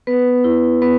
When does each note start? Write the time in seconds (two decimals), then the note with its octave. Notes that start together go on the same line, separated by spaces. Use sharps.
0.07 B3 B4
0.44 E4
0.82 B3 B4